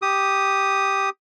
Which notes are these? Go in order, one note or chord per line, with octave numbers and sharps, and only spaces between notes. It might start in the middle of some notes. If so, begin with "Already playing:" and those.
G4 D#6